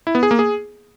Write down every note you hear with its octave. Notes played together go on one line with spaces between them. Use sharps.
E4
B3
G#4
A#3
G#4